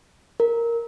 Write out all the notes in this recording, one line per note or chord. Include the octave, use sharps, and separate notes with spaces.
A#4